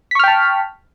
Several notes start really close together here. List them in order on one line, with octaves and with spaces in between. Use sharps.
B6 C#6 F6 G5 A5